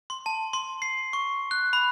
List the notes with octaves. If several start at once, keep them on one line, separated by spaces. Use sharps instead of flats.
C6
A5
C6
C7
C#6
F#6
B5